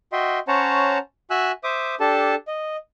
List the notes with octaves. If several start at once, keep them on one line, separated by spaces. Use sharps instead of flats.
F#4 D#5 E5 G5 C6
C#4 C5 C#5 F#5 A5 A#5
F#4 E5 G#5 E6 F#6
C5 E5 D6 D#6
D4 G4 A4 A5
D#5